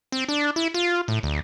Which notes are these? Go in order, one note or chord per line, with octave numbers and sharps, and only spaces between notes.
C4
D4
E4
F4
A2
D2